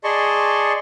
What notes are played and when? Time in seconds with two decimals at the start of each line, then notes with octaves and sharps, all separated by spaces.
0.04 G#4 D5 D#5 A5 C6 C#6